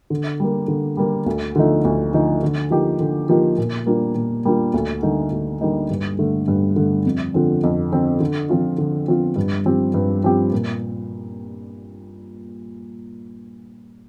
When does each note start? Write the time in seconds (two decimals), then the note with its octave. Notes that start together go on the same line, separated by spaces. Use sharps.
0.10 D3
0.40 G3 A#3
0.68 D3
0.97 G3 A#3
1.26 D2
1.55 D3 F3 A3 D#4
1.85 D2
2.13 D3 F3 A3 D#4
2.43 D3
2.71 F3 A#3 D#4 G4
3.00 D3
3.29 F3 A#3 D#4 G4
3.58 A#2
3.86 G3 A#3 D4 F4
4.15 A#2
4.45 G3 A#3 D4 F4
4.74 D2
5.03 D3 G3 A#3 D#4
5.31 D2
5.61 D3 G3 A#3 D#4
5.90 G2
6.19 D3 A3
6.48 G2
6.76 D3 A3
7.06 F2
7.34 D3 F3 C4
7.63 F2
7.92 D3 F3 C4
8.20 D3
8.49 F3 C4 F4
8.78 D3
9.08 F3 C4 F4
9.36 G2
9.65 F3 C4 G4
9.94 G2
10.24 F3 C4 G4
10.52 A#2